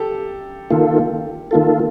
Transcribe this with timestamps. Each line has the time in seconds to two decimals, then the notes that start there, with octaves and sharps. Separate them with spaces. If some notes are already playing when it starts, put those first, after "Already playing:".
Already playing: G4 A4
0.70 D#3 A#3 F4 A4
1.51 D#3 A#3 F4 A4